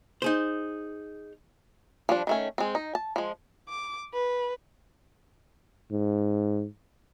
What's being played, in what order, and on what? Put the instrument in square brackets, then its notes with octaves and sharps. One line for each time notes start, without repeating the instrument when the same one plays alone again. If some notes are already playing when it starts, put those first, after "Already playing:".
[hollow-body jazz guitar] D#4 G#4 C5
[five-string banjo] F3 G3 D4
D#3 A3 C#4
G#3 C4
D#4
A5
F3 G#3
[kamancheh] D6
B4
[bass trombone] G#2